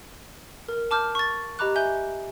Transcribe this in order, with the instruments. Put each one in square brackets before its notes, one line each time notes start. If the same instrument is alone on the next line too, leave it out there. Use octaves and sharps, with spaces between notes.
[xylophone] A#4
A5 D6 F6 G6
C#6 A6
G4 D#5 A#5 B5 D6 F#6
E5 G#5 G6 G7